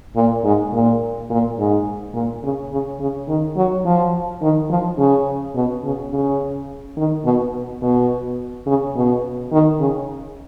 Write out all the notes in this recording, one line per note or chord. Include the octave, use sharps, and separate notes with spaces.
A#2
G#2
A#2
A#2
G#2
A#2
C#3
C#3
C#3
D#3
F#3
F3
D#3
F3
C#3
B2
C#3
C#3
D#3
B2
B2
C#3
B2
D#3
C#3